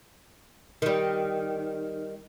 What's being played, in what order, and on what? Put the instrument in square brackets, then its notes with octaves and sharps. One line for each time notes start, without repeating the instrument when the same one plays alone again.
[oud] D#3 G3